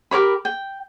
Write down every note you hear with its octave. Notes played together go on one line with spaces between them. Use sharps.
G4 A#4 C#5 B5
G5